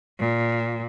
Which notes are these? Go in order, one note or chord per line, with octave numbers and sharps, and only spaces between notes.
A#2